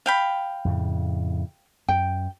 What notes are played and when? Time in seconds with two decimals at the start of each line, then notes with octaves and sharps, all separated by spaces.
0.06 F5 G5 B5
0.65 F2 A2 C#3
1.88 F#2 G5